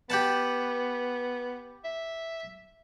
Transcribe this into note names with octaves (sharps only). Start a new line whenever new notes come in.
B3 G4 F#5 A5
E5